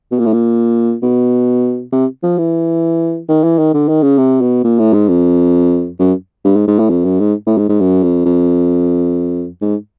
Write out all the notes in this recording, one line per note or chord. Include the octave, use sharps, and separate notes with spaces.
B2
A#2
A2
A#2
B2
C3
F3
E3
D#3
E3
D#3
D3
D#3
C#3
C3
B2
A#2
A2
G#2
F2
F#2
G2
G#2
G#2
A2
F2
F#2
G#2
A2
G#2
G#2
F#2
F2
F2
G#2